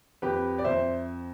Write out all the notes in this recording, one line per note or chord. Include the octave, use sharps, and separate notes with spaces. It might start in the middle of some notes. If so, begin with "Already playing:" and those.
F2 G4 B4
D5
F2 C5 E5